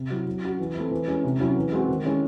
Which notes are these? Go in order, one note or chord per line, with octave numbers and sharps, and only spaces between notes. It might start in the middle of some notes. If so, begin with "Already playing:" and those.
Already playing: C3
F#3 C4 E4
F#3
C#4 F#4
E3
A3 C4 E4
E3
G#3 C#4
C3
F#3 C#4 E4
E3
G#3 C4 F#4
D#3
G#3 C#4 E4